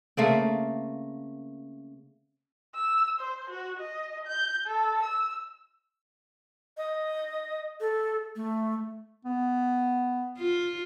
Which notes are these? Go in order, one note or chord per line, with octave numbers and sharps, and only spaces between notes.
C#3 A3 A#3 C4
E6
C5
F#4
D#5
G6
A4
E6
D#5
A4
A3
B3
F4